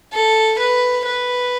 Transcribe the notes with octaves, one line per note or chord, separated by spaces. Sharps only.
A4
B4
B4